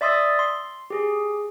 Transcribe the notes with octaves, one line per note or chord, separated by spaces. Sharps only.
D5 E5 C6 D#6 E6 A6
C6
G4 G#4